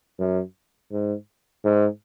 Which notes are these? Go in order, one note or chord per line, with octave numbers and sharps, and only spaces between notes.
F#2
G#2
G#2